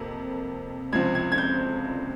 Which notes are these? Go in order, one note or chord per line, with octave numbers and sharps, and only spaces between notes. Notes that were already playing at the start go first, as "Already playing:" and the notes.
Already playing: F2 C3 A#3
C#2 C3 F3 G#6
G#6
G#6
G6